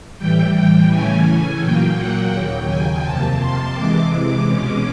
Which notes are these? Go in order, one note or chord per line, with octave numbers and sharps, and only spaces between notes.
A2 E3 G3 G5
G5
C#3 E3 A3 C#4 G#5
A#2 F#3 A#3 G5
F#5
D#2 C#3 F#3 G5
G#5
F2 C3 F3 A#3 A5
C6
C3 E3 G#3 D6
B2 G#3 C#4 D6